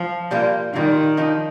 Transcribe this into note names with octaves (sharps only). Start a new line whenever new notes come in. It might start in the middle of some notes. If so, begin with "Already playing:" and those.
Already playing: F3
A#2 G3 A#3 F4
A#2 D#3 G3 A#3 F4
F3 D#4 G4